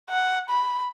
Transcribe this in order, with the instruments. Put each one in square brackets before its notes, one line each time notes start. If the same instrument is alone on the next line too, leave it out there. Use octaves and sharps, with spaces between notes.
[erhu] F#5
B5